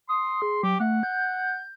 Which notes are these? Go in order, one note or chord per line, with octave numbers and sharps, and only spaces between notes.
C6 D#6
G#4
F#3 G4
A3 F#5
G6